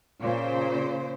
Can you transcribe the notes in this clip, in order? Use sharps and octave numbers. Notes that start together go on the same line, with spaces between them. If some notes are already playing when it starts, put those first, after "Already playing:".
A#2 C#3 C5